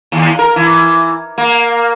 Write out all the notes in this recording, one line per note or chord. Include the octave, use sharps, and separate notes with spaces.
D#2
A#4
E3
A#3